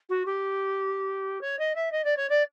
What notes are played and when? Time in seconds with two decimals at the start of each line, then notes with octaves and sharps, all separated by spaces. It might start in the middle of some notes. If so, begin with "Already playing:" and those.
0.09 F#4
0.25 G4
1.41 C#5
1.58 D#5
1.75 E5
1.91 D#5
2.04 D5
2.16 C#5
2.29 D5